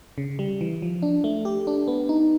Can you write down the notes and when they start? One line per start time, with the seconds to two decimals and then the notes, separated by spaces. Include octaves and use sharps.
0.18 C#3
0.39 G3
0.61 E3
0.82 F3
1.02 D4
1.24 A3
1.45 G4
1.67 D4
1.88 B3
2.09 D#4